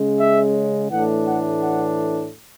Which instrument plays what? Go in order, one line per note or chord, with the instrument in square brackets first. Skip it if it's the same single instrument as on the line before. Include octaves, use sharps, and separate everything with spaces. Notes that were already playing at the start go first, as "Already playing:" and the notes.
Already playing: [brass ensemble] C#3 G#3 C#4
E5
A2 E3 A3 D4 F#5
F#5
F#5